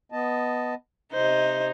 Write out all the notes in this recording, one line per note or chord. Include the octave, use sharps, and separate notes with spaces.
B3 D#5 A5
C3 D#4 C5